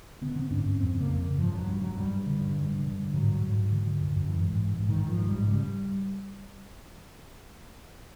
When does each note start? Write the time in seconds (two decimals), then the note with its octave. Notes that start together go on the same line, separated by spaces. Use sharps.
0.22 D3 B3
0.35 D3 C4
0.51 G2 D4
0.65 G2 C#4
0.80 F2 C4
0.94 C#3
1.00 A#3
1.09 F2
1.24 C#3
1.38 G2 F3
1.53 G2 F#3
1.68 G2 G3
1.81 G2 F#3
1.97 G2 G3
2.11 G2
2.26 D3
2.40 G2
2.54 D3
2.69 G2
2.83 D3
2.99 G2
3.13 G#2 F#3
3.28 G#2
3.42 G#2
3.58 G#2
3.72 D3
3.87 D3
4.00 F#2
4.16 F#2
4.29 G#2 E3
4.45 G#2
4.59 G#2
4.74 G#2
4.88 G#2 D#3
5.03 G#2 F3
5.18 G#2
5.27 G3
5.32 G#2
5.47 C#3 G3